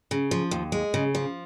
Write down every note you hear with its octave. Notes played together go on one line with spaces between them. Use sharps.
C#3
F3
D#2
G#3
C#3
F3